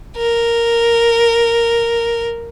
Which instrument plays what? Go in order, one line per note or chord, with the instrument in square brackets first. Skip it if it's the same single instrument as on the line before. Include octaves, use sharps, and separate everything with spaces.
[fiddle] A#4